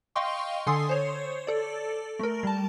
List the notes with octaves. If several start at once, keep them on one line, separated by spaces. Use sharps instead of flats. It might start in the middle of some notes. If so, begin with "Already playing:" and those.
D#5 F5 G5 C6 C#6
D3 A4 G#5 C6 D#6 C7
C5 C#5
A4 D5
A3 A#4
G3 A5